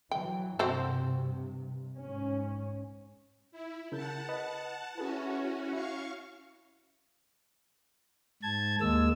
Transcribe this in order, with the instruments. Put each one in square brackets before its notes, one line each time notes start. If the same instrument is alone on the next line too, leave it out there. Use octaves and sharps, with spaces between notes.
[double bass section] E3 F#3 [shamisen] G5
[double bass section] G2 C3 [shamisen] C4 F#4 C5
[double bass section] G#2 C#4
[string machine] E4
[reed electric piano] C#3 A#4 G6 [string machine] F#5 A5
[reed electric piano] B4 D#5
[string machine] C#4 F#4 [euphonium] E4 [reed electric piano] G#4 A4 B4
[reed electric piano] E4 [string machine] F5 C#6
[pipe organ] G#2 A5 G#6
D#2 G#3 A#3 E6